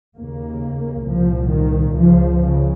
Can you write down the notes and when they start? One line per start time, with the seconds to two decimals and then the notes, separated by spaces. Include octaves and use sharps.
0.17 D#2 C#3 A#3
1.07 C2 A#2 F3
1.51 D#3
1.96 C#2 C#3 F3
2.41 C#3